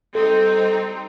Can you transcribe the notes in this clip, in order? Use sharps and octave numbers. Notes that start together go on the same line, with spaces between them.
G3 C4 D#4 A4